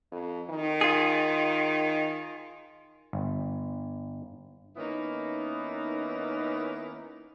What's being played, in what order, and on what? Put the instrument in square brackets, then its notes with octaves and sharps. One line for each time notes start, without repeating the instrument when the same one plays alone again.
[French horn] F2
D#3
[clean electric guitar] F4 G#4
[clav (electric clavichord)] G1
[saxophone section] D#3 A#3 B3 C#4 D#4 E4